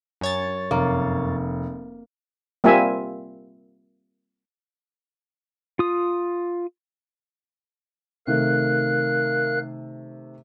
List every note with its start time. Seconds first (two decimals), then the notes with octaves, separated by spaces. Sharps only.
0.21 F#2 C#5 A6
0.71 F1 A#3
2.64 G3 A#3 C4 F4 E5 G#5
5.79 F4 D#6
8.27 C3 D#3 A3 A#4 F5 F#6